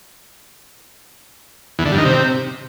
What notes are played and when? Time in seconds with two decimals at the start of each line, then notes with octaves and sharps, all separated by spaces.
1.79 E2
1.85 D3
1.92 G2
1.98 D#3
2.05 C3